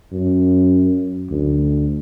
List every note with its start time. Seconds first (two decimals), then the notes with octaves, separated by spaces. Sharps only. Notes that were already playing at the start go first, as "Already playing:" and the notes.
0.12 F#2
1.31 D2